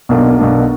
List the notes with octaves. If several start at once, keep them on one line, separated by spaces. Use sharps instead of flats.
B1 B2 A#3 D4
B1 B2 A#3 D4